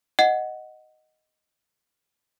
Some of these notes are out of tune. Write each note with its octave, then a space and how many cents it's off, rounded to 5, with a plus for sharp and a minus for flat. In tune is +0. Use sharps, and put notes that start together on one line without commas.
D#5 +0 F#5 +0